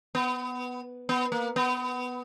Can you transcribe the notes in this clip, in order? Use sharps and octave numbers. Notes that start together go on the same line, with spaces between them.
B3
B3
A#3
B3